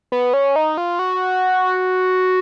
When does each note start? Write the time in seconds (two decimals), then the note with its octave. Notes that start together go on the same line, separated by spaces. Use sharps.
0.12 B3
0.33 C#4
0.56 D#4
0.77 F4
0.99 F#4